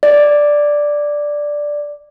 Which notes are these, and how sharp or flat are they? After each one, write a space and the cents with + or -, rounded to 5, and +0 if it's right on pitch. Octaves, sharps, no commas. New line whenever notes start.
D5 +0